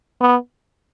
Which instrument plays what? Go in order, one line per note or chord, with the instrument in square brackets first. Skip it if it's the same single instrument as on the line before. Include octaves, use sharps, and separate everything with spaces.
[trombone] B3